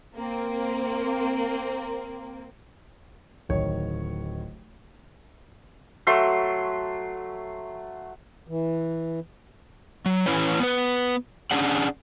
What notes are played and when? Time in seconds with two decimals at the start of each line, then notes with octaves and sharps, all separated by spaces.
0.15 A#3 C4
3.49 D1 D#3 C#5
6.07 F#3 A3 C6
8.48 E3
10.06 F#3
10.26 E3 C#4 E4 B4 C#5
10.60 B3 B4
11.51 C#4 D4 G#4 D5 F#5